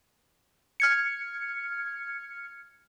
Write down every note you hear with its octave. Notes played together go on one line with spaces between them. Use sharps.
F6 G#6 C#7